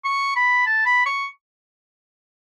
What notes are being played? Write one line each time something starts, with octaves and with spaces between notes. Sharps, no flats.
C#6
B5
A5
B5
C#6